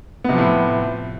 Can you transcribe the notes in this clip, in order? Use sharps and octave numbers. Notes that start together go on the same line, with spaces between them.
A2 C3 F3 B3